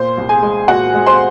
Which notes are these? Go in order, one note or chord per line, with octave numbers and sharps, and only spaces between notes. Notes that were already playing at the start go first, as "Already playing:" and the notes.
Already playing: A#2 C5 C6
C2
G#4 G#5
G#3
A#2 F#4 F#5
G#3
C5 C6